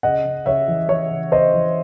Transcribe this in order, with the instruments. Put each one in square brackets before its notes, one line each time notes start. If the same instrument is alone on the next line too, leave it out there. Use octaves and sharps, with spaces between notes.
[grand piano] C#3 D#5 F#5
C#3
C#3 C#5 E5
E3
E3 C#5 E5
C#3
C#3 C5 D#5
E3